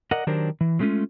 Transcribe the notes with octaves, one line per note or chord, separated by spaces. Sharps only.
A#4 D5 D#5 F#5
D#3 F#3 D4 G4 A#4 C5
E3
F#3 G#3 A3 B3 C#4 F4